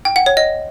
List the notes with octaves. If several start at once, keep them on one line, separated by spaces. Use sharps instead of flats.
G5
F#5
C#5
D#5